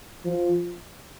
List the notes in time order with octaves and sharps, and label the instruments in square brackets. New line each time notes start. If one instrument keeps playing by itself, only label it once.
[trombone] F3